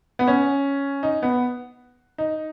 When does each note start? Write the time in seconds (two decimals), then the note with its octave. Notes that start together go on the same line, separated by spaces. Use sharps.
0.19 B3
0.28 C#4
1.03 D#4
1.23 B3
2.18 D#4